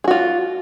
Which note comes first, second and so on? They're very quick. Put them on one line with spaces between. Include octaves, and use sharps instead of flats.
G#4 F#4 F4